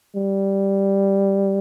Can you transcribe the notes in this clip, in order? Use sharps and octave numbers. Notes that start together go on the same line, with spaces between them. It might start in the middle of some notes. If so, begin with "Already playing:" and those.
G3